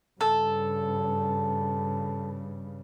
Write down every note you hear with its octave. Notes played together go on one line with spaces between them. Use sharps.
G2 C#3 A4